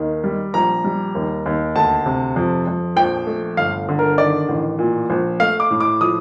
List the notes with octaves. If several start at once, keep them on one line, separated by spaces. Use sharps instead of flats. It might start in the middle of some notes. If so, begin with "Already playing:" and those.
Already playing: D#2 D#3
G3
A#1 A#5
G3
D#2
D#2
D2 A5
C3
F2
F2
A#1 G5
A3
G1 F5
D3
A#4
D#3 D5
A1
A#2
A#1
A3 F5
D6
A2
D6
F3 D#6